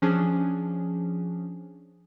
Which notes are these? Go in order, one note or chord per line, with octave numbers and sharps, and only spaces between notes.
F3 C#4 D4 G#4